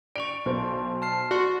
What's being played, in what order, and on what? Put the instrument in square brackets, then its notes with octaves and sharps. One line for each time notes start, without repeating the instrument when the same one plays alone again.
[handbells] D5 C#6 [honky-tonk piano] D7 F7
[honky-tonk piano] B1 C5
[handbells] A5 F6 C7
[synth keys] F#4 [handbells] D5 C6